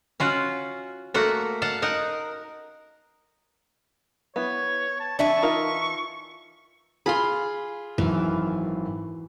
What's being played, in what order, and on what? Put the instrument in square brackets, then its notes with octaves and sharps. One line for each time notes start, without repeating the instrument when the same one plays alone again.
[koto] C#4 F4 F#4
A3 A#3 F#4 F#5 A#5
F5 F#5 A5
D#4 A#4 F#5
[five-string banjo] B3 E4 [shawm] C#5
[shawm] A5
[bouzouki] E3 E5 A5 [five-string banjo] D4 [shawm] C#6
[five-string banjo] D#4 F4 A#4
[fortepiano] F4 G#4 [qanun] B5 C6
[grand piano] G#1 F#2 [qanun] E3